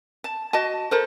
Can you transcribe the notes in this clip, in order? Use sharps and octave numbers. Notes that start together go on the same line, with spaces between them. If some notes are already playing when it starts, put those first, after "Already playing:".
A5
F#4 D#5 A5
A4 A#4 C5